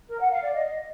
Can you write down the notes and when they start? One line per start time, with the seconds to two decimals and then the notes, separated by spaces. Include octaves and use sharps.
0.08 A#4
0.19 F#5
0.31 F5
0.42 D5
0.53 D#5